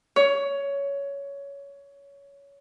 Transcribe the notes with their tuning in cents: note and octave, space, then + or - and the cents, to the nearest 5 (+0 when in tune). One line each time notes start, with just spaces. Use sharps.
C#5 +15